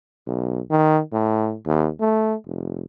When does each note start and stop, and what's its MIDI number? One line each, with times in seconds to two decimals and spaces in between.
0.27 0.60 35
0.70 1.00 51
1.12 1.55 45
1.66 1.89 39
2.00 2.35 57
2.47 2.83 29